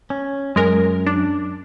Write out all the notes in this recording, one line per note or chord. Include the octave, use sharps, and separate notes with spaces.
C#4
F#2 G#3 A#4
D4